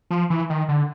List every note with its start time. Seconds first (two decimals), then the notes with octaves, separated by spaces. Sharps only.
0.11 F3
0.30 E3
0.50 D#3
0.69 D3